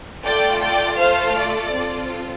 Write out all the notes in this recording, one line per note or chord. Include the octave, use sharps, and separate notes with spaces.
A3 F4 A4 D5 G5
D5 G5
A3 F4 A4 C5 F5
D5
C4 F4 A4